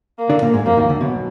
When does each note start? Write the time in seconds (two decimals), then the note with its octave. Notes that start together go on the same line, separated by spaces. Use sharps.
0.18 A#3
0.30 D3 D4
0.42 A#2 A#3
0.54 G#2 G#3
0.65 F2 F3 A#3
0.77 D#2 D#3
0.89 D2 D3
1.01 B1 B2